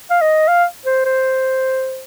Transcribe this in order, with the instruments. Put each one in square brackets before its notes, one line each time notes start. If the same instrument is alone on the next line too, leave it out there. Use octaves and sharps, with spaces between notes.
[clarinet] F5
D#5
F5
C5
C5